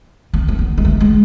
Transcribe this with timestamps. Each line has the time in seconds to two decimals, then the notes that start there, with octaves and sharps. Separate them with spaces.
0.34 C4
0.48 C4
0.59 B3
0.78 G#3
0.85 A3
1.00 G#3